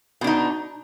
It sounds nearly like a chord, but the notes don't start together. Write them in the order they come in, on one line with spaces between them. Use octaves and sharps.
B2 D4 D#4